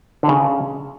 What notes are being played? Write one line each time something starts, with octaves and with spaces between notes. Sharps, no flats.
D3
C#3